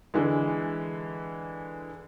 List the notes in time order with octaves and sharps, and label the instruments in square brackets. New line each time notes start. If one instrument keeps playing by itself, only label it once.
[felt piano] D3 E3 G#3